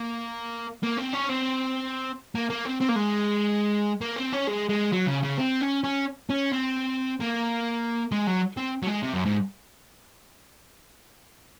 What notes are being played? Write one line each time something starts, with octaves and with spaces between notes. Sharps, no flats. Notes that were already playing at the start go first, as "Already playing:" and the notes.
Already playing: A#3
A#3
C4
C#4
C4
A#3
A#3
C4
C4
A#3
G#3
A#3
C4
C#4
G#3
G#3
F#3
C#3
C#3
C4
C#4
C#4
C#4
C4
A#3
G#3
F#3
C4
F#3
G#3
C3
F#2
G#2